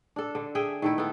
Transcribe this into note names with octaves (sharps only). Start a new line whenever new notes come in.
D4 A4
D3
G#4 E5 G5
D#3 A3 E4
B3 A4